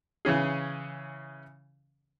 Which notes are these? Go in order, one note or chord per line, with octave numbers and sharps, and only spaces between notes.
C#3 E3 C#4 G#4